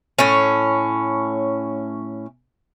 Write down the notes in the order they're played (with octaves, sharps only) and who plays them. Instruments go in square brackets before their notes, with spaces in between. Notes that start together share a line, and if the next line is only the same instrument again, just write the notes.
[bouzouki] A2 C#4